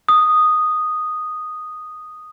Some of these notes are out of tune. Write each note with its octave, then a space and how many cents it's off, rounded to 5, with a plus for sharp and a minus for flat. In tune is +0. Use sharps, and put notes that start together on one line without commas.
D#6 -5